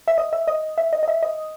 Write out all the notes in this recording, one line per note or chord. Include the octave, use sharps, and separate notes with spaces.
E5
D#5
E5
D#5
E5
D#5
D#5
E5
D#5